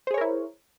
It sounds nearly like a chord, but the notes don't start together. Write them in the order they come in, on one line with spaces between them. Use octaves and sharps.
C5 G#4 C#5 A#4 E4